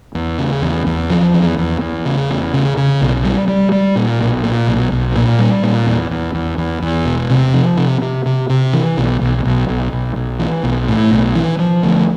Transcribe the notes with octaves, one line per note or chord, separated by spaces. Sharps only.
E2
C#3
E2
E2
F3
E2
E2
E2
C#3
E2
C#3
C#3
B1
G3
G3
G3
A#2
B1
A#2
B1
B1
A#2
G3
A#2
E2
E2
E2
E2
E2
E1
C3
F3
C3
C3
C3
C3
E3
B1
B1
B1
B1
B1
B1
E3
B1
A2
B1
E3
F3
D2